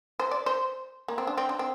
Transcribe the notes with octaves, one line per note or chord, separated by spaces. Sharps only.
C5
D5
C5
A#3
C4
D4
C4
D4
C4